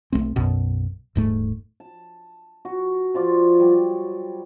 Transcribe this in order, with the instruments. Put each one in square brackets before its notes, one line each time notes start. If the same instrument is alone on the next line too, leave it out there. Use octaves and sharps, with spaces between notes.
[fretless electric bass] B1 F#2 A3 C4
B1 F#2 B2
D#1 G#2 A3
[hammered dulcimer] A5
F#4
F3 F4 D5
F#3 G3